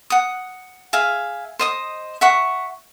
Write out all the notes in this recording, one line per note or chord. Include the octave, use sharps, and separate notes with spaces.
F#5 D#6
G#4 E5 F5
C5 D#5 D#6
E5 F#5 C#6